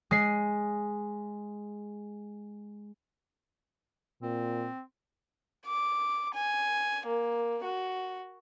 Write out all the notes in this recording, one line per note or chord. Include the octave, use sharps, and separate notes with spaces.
G#3 C7
A#2 C4
D6
G#5
A#3
F#4